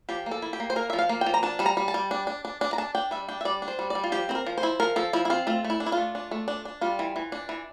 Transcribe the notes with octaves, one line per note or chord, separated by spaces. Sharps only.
F3 G4
A#3
A4
E4
G4
A#3
C5
A#3 A#4
F3 E5
F5
A#3
G5
F3
A#5
D4 A5
G3 A5
A#5
G3
A5
G3
D4
D4
D4
D4
A#5
D4 A5
D4 G5
G3 E5
D4 G5
E5
G3 D5
D4
C5
G3
G3 D5
F4
F3 G4
C4 C5
A#4
F3
C5
E4
F3 A#4
F3 A4
F3 E4
E4
C4 F4
A3 F4
A3
E4
D4
E4
F4
A3
D4
A3
D4
D4
G3 F4
E3
E3
D4
E3